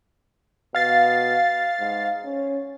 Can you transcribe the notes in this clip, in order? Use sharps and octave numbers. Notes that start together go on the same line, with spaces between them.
B2 F5 A6 C7
G#2
C#4